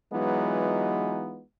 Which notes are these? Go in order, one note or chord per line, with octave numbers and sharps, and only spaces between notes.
E3 F#3 G#3 B3 D#4 F4